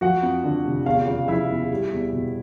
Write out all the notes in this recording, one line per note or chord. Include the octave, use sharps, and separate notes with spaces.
F3 F#4 F#5
F2
D3
F1
E2 F4 F5
C#3
F3 E4 E5
E2
G3
E2
B2